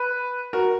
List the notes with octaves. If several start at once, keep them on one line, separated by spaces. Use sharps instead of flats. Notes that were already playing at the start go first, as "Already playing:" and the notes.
Already playing: B4
F#4 A#4